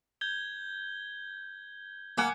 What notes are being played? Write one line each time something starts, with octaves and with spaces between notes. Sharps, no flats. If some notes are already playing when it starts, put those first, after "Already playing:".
G6 G#6 G7
A#3 F#5 G#5 D6